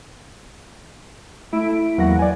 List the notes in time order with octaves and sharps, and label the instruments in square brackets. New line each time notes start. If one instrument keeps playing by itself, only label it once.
[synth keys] A3 E4 E5 D7
E2 F#3 A#3 E4 F#5 A#6
D5 G#5